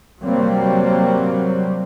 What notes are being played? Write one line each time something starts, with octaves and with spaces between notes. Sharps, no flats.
C3 F#3 G3 A#3 C4